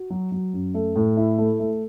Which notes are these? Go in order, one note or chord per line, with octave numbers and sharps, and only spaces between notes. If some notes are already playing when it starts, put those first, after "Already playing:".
Already playing: F#4
F#3
F#3
F#2
A3
A2
E4
A3
A3